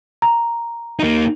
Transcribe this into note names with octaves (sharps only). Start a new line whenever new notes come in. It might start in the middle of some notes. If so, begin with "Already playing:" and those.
A#5
A#3 D#4